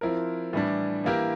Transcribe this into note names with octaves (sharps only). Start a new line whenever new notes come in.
F3 C4 E4 A#4
A2 E3 G3 D4
E3 A#3 E4 G4 A#4